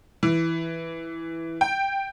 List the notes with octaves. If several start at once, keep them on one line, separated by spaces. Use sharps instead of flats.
E3
G5